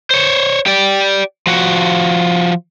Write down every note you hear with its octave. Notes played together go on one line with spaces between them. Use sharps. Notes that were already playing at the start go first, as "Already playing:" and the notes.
C5 C#5
G4 D5
F3 F#4